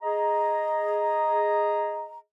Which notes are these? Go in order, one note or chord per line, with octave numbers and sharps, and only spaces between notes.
G#4 D#5 A#5